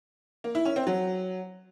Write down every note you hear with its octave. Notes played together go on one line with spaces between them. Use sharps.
A#3
E4
C#4
C4
F#3